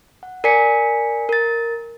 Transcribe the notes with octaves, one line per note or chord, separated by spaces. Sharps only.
F#5
A#4 D5 G#5 B6 C#7
A#4 A6